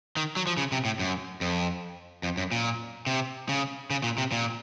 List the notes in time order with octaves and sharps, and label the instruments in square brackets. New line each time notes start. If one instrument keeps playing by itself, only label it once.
[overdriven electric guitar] D#3
F#3
F3
C#3
C3
A2
F#2
F2
F2
F#2
A#2
C3
C#3
C#3
A#2
C3
A#2